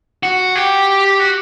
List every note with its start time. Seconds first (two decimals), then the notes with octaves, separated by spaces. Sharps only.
0.23 F#4
0.56 G4
1.20 F#4